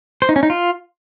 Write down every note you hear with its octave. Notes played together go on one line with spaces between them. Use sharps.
C5
D#4
C#4
D#4
F4